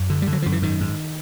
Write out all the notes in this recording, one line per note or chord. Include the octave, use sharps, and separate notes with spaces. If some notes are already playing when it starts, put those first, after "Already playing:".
Already playing: F#2
D3
G3
D3
F#3
F#2 F3
E3
G#2 D#3
G#2